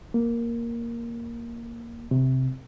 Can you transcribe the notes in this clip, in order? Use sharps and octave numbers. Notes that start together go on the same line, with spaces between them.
A#3
C3